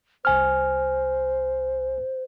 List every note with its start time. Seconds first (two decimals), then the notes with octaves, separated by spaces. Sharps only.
0.25 C2 C5 G#5 F6